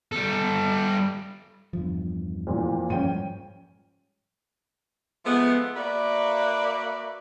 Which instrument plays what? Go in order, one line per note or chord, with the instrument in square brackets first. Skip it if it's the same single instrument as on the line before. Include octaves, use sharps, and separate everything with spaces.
[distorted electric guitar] G3 A4
[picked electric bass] E2 G2 F3
[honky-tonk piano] F2 A#2 E3
[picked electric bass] G#2 F3 G3 [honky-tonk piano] C#4 G5 D#7
[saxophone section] F3 G#3 A3 B3
A#3 F#4 B4 D5 E5